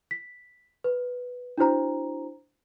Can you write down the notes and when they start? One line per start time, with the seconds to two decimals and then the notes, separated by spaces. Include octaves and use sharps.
0.11 B6
0.84 B4
1.58 D4 E4 F#4 C5 A#5